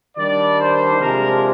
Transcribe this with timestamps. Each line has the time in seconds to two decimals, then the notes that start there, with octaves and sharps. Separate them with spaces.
0.17 D#3 G3 D4 D5
0.60 C5
1.02 C3 F3 G#3 D4 A#4